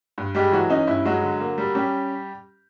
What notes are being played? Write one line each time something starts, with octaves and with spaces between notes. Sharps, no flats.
G2
G3 G#3 G4
E3 F#3 F#4
C#4 D#4
G2 E4
F#3 G#3 F#4
D3
A#3
G3
G3 C#4 G4